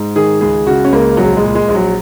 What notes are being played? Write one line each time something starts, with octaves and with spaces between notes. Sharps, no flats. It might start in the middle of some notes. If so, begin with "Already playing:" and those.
Already playing: G#2
D#3 G#4
C#2 G#4
C#3 F#4
C#4
C#2 A#3
A#1 F#3
G#3
A#2
G#3
A#1
F#3